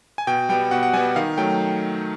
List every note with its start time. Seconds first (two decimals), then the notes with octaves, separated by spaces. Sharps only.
0.18 G#5
0.27 B2 G5
0.49 G3 B3 G5
0.71 B2 F#5
0.83 F#5
0.93 G3 B3 G#5
1.16 D#3 F5
1.38 F#3 A3 G5